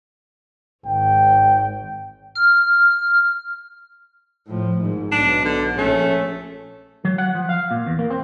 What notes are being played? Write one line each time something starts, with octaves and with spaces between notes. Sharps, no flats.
G#1 G5
F6
A2 F3
G#1 G#2
B1 B2 D4
D3
A#1 A3 C#4
F#3
F#5
F3
F5
A#2
E2
A#3
C4